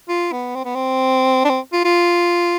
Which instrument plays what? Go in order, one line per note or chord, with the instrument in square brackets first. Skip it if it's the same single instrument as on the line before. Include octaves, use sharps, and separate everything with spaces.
[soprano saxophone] F4
B3
C4
B3
C4
D4
C4
F4
F4